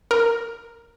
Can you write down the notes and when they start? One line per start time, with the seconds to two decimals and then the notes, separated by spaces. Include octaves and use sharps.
0.11 A#4